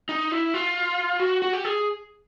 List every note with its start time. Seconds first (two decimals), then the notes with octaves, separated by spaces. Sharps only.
0.09 D#4
0.32 E4
0.54 F4
1.20 F#4
1.42 F#4
1.53 G4
1.64 G#4